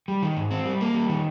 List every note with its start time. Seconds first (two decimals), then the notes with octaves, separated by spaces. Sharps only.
0.08 G3
0.23 D#3
0.37 G#2
0.51 C4
0.65 G3
0.81 A#3
0.95 G3
1.09 D#3